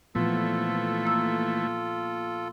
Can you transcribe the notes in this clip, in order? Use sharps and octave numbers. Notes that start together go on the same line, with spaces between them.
A#2 E3 F3 A3 B3 F4 A4
A#3 E6